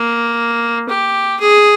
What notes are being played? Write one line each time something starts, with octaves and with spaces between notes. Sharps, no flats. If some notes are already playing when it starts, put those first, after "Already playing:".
Already playing: A#3
G4
G#4